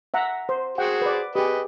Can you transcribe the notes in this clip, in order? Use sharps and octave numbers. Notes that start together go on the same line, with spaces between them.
E5 F#5 A#5
C5
F#4 G#4 C5 F#5 G5
B4 D5
G4 G#4 B4 D#5